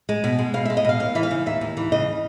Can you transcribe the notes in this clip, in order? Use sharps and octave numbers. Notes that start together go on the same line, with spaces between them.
G#3
B2
G#3
B2 F5
G#3 E5
D#5
B2 F5
D#2 F5
E3 E5
F5
C#3
D#2 E5
D#2
E3
C#3 D#5